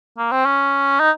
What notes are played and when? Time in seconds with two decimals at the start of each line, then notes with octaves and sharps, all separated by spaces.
0.18 A#3
0.32 C4
0.45 C#4
1.00 D#4